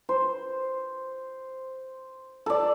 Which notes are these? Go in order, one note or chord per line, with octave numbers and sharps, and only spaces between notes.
C5
A4 D5